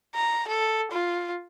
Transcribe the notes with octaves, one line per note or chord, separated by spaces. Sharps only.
A#5
A4
F4